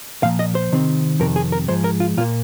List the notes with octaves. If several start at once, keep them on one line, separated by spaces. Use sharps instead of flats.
A#2 F3 A#3 F5
D#5
C5
C3 D#3 C4
F2 C3 D#3 A#4
G#4
A#4
G#2 F3 G#3 C5
A#4
F4
A#2 A#3 F4